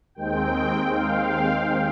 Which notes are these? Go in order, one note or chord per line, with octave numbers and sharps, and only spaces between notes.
D#2 D#3 G#3 C4 G5
F5